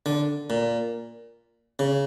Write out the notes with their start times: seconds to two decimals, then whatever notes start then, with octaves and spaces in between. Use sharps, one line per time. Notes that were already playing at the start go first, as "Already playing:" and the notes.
0.06 D3
0.50 A#2
1.79 C#3